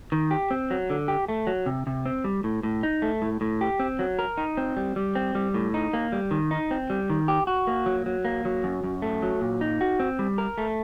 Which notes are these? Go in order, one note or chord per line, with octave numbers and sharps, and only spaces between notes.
D#3
G4
C4
F#3
D3
G4
A3
F#3
C3
C3
C4
G3
A2
A2
D#4
A3
A2
A2
G4
C4
F#3
A#4
D#4
C4
G3
G3
C4
G3
A2
D#4
A#3
G3
D#3
D#4
C4
G3
D#3
G4
F#4
A#3
F#3
F#3
A#3
F#3
F#2
F#2
A3
F#3
A#2
D#4
F#4
C4
G3
A#4
A3